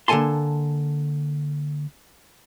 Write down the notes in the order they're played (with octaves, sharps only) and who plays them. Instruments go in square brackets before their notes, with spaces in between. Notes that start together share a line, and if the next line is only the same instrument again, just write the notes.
[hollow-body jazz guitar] D3 A#3 A4 G#5 A5 C6